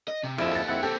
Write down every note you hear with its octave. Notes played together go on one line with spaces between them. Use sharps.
D#5
C3
A#1 F2 F3 D#4 E4 G4 E7
A4 A6
F2 C4 E4 F#5
A#3 C4 G4 A4